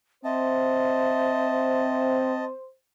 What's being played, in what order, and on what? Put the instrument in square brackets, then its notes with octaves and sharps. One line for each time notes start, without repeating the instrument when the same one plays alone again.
[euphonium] C4 [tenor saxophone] C5 [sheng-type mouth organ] D#5 A5 [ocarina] E5